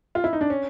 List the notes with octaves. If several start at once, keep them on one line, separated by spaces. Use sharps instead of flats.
F4
E4
D#4
D4
C#4